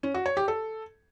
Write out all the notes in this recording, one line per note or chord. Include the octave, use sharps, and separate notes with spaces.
C#4
F#4
C#5
G4
A4